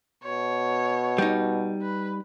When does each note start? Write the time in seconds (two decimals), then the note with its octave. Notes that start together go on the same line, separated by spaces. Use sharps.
0.24 B2 C#5
1.18 G3 D#4
1.82 B4